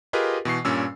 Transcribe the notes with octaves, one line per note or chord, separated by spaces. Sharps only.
F4 G4 G#4 A#4 B4 D#5
B2 E3 C#6 C7
G2 A#2 C#4 E6